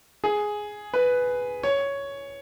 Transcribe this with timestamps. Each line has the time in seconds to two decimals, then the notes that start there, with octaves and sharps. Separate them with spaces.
0.24 G#4
0.94 B4
1.63 C#5